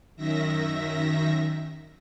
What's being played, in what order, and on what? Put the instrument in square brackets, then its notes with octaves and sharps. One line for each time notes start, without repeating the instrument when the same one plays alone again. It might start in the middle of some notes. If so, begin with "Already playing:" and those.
[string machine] F#2 D#3 E5 A#6